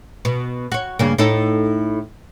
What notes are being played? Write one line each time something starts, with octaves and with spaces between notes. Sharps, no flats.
B2
F#4 C#5
G2 C#3 A#3
A2 D#4 A4